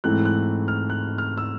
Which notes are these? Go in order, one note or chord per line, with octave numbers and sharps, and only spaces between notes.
G#2 E3 A3 C4 F#6
F#6
F6
F#6
F6
E6